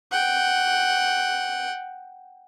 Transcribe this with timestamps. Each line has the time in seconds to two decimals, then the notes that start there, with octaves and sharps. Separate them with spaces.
0.12 F#5 G5